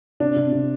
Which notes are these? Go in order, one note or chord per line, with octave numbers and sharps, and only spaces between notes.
C3 D4
C3
C3